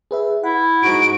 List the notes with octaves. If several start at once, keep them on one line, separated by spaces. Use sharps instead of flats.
G#4 B4 E5
E4 F#5
G#2 F#4 D7